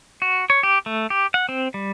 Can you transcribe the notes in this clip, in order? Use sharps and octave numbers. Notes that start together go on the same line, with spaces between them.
F#4
C#5
G4
A3
G4
F#5
C4
G3